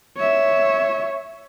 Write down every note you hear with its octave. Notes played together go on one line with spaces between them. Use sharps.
C#5 E5